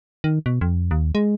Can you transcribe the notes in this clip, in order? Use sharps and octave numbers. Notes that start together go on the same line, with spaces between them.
D#3
B2
F2
D#2
G#3